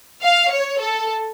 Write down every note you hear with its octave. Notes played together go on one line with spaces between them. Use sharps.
F5
C#5
A4